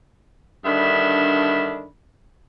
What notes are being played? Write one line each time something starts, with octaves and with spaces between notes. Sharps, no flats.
G2 D3 D#3 D4 E5 B5